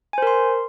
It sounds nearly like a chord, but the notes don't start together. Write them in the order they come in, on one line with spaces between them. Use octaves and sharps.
G#5 C5 A#4 C6